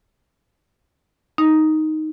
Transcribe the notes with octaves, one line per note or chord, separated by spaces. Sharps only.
D#4